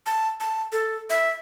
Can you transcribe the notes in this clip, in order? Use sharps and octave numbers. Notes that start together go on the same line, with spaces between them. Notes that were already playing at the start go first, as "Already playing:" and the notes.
A5
A5
A4
E5